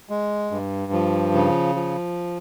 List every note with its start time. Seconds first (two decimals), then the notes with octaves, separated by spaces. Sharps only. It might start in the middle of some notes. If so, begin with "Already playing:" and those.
0.09 G#3
0.51 G2
0.92 F3
1.34 C#3
1.75 F3